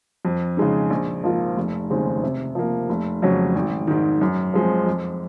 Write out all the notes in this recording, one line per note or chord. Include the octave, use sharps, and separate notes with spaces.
F2
C#3 G#3 D#4
A#1
G#2 F3 A#3 F4
F1
D#2 C#3 G#3 C4
C3
F3 A#3
F1
F2 C#3 F#3 C#4
G#1
G#2 D#3
F#2
F3 G#3 C4
F2